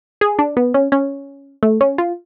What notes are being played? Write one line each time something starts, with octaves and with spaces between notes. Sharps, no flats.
G#4
D4
B3
C#4
C#4
A3
C#4
F4